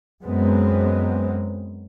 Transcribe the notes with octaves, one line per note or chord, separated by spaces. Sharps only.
F#2 F#3 G#3 B3 C4